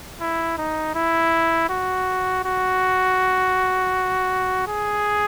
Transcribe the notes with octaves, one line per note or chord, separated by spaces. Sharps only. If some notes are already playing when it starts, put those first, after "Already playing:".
E4
D#4
E4
F#4
F#4
G#4